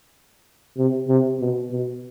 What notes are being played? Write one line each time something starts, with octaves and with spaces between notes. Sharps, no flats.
C3
C3
B2
B2